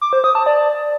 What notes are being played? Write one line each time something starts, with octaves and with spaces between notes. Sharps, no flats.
D6
C5
D#6
A5
D5